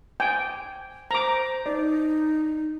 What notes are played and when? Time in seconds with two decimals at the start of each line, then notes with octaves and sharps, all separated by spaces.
0.20 G5 G#5
1.11 C5 A#5 D6
1.66 D#4 D5